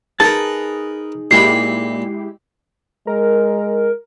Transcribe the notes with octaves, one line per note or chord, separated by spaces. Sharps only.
D#4 G#4 A#4 B4 A5
A#2 G#3 E4 G4 B5 C7
G#3 A#4